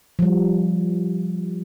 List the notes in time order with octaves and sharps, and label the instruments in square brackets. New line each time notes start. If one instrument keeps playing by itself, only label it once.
[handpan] F3 G3